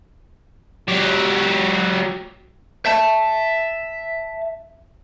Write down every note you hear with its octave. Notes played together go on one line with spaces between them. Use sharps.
F#3 G4
E5 A5